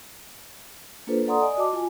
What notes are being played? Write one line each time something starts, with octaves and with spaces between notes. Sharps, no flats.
A#3 D4 F4 A4 B4 C5
A4 D5 F#5 A#5 C6 D#6
D5 D#5 G#5 D#6
F#4 D#5 A5 D6
F4 G#5